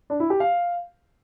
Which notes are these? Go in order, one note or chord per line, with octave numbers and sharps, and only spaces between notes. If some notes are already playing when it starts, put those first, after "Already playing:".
D4
E4
G4
F5